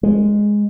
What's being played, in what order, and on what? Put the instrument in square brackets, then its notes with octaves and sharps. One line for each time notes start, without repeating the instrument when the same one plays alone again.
[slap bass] G#3